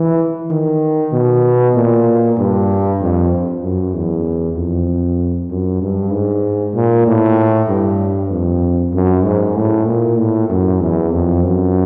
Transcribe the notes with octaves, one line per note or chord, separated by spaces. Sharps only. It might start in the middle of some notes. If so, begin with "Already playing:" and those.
Already playing: E3
D#3
B2
A#2
G2
F2
F#2
E2
F2
F#2
G2
G#2
A#2
A2
G2
F2
F#2
G#2
A2
A#2
A2
F#2
E2
F2
F#2